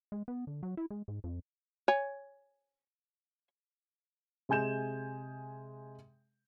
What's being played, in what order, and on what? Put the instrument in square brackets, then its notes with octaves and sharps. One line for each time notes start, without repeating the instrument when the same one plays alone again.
[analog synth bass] G#3
B3
D3
F#3
E4
G#3
G#2
F2
[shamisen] C#5 G#5
[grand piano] C3 G#3 G#5 G6 E7